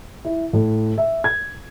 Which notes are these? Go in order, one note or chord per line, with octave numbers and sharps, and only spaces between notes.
E4
A2
E5
G#6